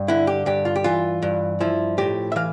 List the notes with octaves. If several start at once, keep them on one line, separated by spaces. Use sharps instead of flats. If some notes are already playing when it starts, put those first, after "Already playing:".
Already playing: G2
D3 E4
G4
G2 G4
F4
G4
E3 F4
G2
F3 E4
A2 G4
E5
E3 F5